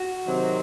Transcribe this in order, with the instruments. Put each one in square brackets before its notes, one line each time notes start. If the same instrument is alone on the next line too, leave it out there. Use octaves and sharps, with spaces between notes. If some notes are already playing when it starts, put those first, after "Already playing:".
Already playing: [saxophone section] F#4
C3 D#3 F#3 C4